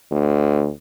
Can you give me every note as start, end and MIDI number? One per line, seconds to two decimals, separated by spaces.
0.12 0.70 38